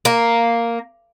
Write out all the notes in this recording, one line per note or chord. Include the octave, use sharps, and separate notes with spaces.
A#3